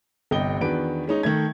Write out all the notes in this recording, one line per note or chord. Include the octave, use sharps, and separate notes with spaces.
G1 C2 D#5 G5 G7
E2 D#3 D4 F#4 B4 D7
G#3 C#4 D#4
D#3 A3 G#6